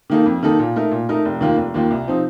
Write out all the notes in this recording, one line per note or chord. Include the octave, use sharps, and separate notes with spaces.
D#3 A#3 D#4 A4
F2
D#3 A#3 D#4 A4
A#2
A3 D#4 A#4
A#2
A3 D#4 A#4
F1
D#2 D#3 A#3 F4
F1
D#2 D#3 A#3 F4
C2
C3 F3 C4 D#4